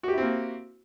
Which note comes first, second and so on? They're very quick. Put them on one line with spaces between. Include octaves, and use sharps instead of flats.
F#4 G4 E4 C4 A#3